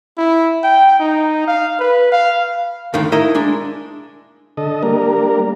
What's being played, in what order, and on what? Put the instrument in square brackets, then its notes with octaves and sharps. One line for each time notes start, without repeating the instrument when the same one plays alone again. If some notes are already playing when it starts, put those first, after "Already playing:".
[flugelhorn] E4
G5
D#4
F5
B4
F5
[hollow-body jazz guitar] D#2 A2 D3 D#3
D#4 E4 A#4 D#5
G#3 D4
[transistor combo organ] D3 A4 D#5
G3 A#3 D4 A#4